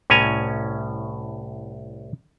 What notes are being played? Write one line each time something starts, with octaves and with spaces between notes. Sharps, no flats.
C2 A2 C#4 G#5 A#5